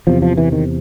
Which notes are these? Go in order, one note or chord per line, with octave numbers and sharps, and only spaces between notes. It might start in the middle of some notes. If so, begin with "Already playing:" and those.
E2 C3 F3
F3
E3
D#3